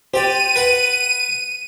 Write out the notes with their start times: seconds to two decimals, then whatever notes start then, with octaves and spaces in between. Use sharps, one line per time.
0.14 G4 C5 D5 G5 D#7
0.56 B4 F#5